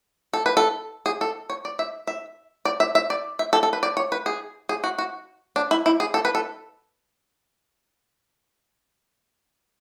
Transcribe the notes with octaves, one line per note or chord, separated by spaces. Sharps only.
A4
B4
A4
G#4
A4
C#5
D5
E5
E5
D5
E5
E5
D5
E5
A4
A4
B4
D5
C#5
B4
G#4
G#4
F#4
F#4
D4
E4
E4
G#4
A4
B4
A4